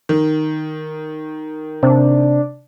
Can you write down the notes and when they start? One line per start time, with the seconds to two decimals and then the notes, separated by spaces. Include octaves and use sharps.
0.09 D#3
1.83 C3 D4